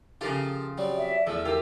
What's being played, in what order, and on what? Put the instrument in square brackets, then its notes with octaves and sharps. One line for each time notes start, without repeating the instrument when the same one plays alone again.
[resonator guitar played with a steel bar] C#3 F3 F4 [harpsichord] G4 A4 A#4
[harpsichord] F#3 G3 C4 [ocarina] D5
[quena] E5
[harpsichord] E2 A3 [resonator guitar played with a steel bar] F3 [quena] E6
[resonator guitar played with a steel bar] F4 G4 [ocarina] A#4 [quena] E6